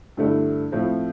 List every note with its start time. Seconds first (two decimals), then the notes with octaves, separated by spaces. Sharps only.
0.17 G2 D3 A3 E4
0.72 A2 F3 C4 E4